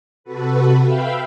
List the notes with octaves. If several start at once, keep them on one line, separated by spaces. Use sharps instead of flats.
C3 F#4 A4 B4
E5 F5 G5 B5